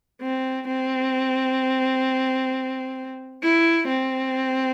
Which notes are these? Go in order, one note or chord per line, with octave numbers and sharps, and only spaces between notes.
C4
C4
E4
C4